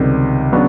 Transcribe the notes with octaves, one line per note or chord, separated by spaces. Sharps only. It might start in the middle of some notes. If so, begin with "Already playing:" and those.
Already playing: C#2 C3 D#3 G3 C4
C#3 F#3 B3 D4